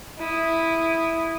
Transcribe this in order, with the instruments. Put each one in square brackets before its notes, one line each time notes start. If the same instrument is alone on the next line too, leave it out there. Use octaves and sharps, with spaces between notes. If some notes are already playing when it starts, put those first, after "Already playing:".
[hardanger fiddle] E4 D#6